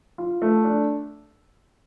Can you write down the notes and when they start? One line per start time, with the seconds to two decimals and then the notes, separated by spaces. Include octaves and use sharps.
0.18 F4
0.42 A3
0.64 D4